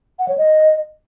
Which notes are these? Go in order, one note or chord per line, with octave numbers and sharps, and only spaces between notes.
F#5
C#5
D#5